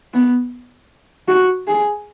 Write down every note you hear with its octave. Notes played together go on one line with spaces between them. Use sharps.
B3
F#4
G#4